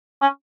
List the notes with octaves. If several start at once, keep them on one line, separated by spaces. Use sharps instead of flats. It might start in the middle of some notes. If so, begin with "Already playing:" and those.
C#4